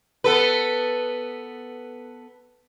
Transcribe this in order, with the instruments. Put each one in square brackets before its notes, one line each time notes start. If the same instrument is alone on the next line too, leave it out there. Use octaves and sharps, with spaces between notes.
[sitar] B3 A4 B4